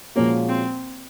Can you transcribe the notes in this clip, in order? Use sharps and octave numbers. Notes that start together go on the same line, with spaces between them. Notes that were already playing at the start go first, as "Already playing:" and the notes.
A#2 F3 G#3 A#3 C#4 F#4
C4